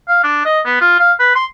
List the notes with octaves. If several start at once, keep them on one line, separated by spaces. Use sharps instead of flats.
F5
D4
D#5
B3
F4
F5
B4
C6